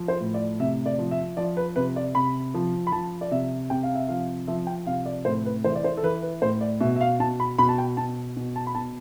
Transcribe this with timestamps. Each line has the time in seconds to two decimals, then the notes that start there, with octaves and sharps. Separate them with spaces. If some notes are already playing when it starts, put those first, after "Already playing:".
Already playing: F3
0.08 C5
0.20 A2
0.34 D5
0.60 C3 E5
0.86 D5
0.99 F3
1.11 E5
1.37 F3 D5
1.57 B4
1.76 C3 B4
1.96 D5
2.15 C3 B5
2.54 F3
2.87 B5
2.92 F3 A5
3.21 D5
3.31 C3 E5
3.70 C3 G5
3.83 F5
3.95 E5
4.08 F3 F5
4.47 F3 E5
4.67 G5
4.86 C3 F5
5.06 D5
5.25 A2 C5
5.46 B4
5.64 E3 C5
5.76 D5
5.84 C5
5.97 A4
6.03 E3 B4
6.22 B4
6.42 A2 C5
6.61 D5
6.81 B2 E5
6.96 E5
7.01 F5
7.20 B2 A5
7.40 B5
7.58 B2 B5
7.69 A5
7.78 G5
7.97 B2 A5
8.37 B2
8.56 A5
8.67 B5
8.75 B2 A5